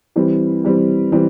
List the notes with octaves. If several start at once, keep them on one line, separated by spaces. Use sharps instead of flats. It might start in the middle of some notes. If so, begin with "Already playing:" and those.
E3 G3 C4
E3 G3 C4
E3 G3 C4